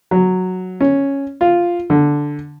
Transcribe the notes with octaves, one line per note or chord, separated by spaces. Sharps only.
F#3
C#4
F4
D3